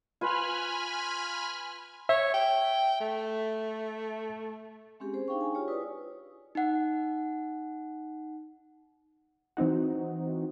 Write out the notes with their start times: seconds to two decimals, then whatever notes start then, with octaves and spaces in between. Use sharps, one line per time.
0.21 F4 B4 G#5 B5 F6
2.09 C#5 E5
2.34 G5
3.01 A3
5.00 G#3 C4 C#4 G4 G#4
5.13 C#4 G#4 C5
5.28 D4 D#4 G#4 F5 G5 C#6
5.41 G#5
5.55 F4 G4 C#5
5.68 E4 G4 B4 D5 D#6
6.55 D#4 F#5
9.57 E3 C4 D#4 F#4